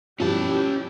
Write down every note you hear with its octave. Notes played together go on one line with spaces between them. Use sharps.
G2 B2 F3 C#4 E4 G4 A5